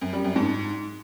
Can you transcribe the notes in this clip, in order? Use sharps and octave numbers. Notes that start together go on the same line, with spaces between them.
F#2
G3
F#2
G#2